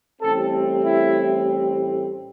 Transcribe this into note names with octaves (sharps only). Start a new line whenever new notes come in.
A1 A2 G3 C4 A4
E4